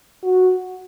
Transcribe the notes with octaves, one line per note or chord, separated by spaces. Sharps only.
F#4